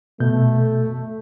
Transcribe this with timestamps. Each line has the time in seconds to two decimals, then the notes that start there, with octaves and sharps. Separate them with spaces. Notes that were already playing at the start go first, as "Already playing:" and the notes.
0.20 B2 A3 G6